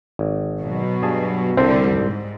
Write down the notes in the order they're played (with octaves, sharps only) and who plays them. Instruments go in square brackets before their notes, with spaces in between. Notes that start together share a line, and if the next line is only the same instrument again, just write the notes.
[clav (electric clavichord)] G#1
[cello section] B2 F#3
[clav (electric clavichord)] G2 G#4 A5
[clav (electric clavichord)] C2 A4 E5 [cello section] D3 G3 [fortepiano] C4
[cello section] G#2